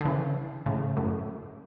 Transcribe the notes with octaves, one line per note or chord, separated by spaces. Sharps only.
D3
C#3 E3
A2 C#3
F#2 A2